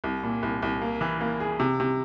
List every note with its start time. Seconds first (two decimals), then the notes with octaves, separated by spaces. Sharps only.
0.04 C2
0.23 A#2
0.43 C2
0.62 C2
0.82 A#3
1.01 E3
1.21 A#3
1.40 G#4
1.60 C3
1.80 C3